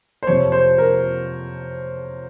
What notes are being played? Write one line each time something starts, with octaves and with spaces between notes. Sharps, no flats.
C5
F2 C3 F3 C#5
C5
A#4